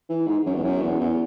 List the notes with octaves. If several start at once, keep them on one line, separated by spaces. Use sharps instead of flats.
E3
G#2
F#2
E2
F#2
E2
E2